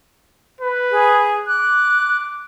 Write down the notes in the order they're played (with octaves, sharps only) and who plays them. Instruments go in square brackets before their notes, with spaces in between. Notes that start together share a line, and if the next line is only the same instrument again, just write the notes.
[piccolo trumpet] B4
[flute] G#4
[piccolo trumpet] D6 [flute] F#6